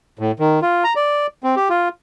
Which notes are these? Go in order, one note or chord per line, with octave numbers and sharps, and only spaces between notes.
A2
D#3
F4
A#5
D5
C4
G4
F4